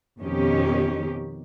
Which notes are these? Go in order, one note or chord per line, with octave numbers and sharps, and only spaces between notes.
F2 B2 D#3 C#4 D#4 G4